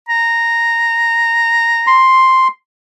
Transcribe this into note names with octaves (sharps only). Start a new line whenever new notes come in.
A#5
C6